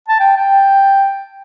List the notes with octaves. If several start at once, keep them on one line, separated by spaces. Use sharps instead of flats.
A5
G5
G5